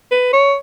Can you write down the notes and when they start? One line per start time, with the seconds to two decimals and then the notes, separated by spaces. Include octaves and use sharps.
0.11 B4
0.33 C#5